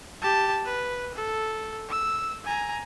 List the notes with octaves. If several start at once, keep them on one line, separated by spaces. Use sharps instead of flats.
G4 A5
B4
A4
E6
G#5 A#5